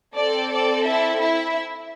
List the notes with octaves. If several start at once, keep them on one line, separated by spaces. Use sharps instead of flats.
C4 A4 D5
D5
E4 E5
E4 E5